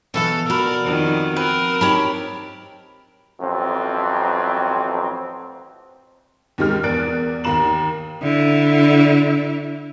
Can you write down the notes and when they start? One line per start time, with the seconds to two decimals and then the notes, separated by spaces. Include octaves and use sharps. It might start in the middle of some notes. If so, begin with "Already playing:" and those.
0.14 B2 E3 A4 F5
0.50 F#4 A#4 D5 B5
0.84 F2 D#3
1.36 C4 A#4 B4
1.81 D#4 G4 C#5 A5 B5
3.41 A1 F2 F#3 C4
6.58 D#2 C3 D#3 G#3 G4 F6
6.83 E2 A#4 D5 F#6 A6 D7
7.44 D#2 A#3 F5 A#5 E7 F#7
8.22 D3 E4